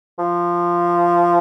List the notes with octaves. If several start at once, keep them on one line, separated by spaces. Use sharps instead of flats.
F3